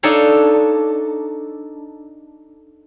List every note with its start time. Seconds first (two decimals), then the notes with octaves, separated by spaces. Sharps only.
0.03 D4 D#4 A4 C#5 F5